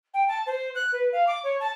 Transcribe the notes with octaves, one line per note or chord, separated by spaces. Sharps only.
G5
A5
C5
F#6
B4
F5
D6
C#5
A5